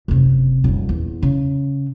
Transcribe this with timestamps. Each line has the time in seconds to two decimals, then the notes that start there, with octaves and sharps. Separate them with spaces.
0.08 F#1 C3
0.64 D#1 F2
0.89 E2
1.22 C#3